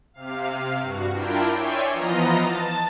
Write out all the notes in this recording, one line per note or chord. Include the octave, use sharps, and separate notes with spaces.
C3 F5
G2 F#4
D4 E4 F4 A#4 G5
C#5 D5 E5 G5 G#5 C6
E3 F3 B3 F4 D#5 A#5
A5 A6